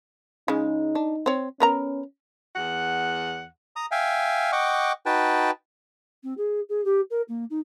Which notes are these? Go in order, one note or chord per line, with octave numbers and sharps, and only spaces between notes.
C#3 G#3 D#4
D4
C4 C#5
B3 C#4 A#4 A#5
E2 F#5
A#5 D#6
E5 F5 G5 G#5
D#5 F#5 G5 C#6 D6
D#4 F#4 B4 G5 A5
C4
G#4
G#4
G4
A#4
A#3
D#4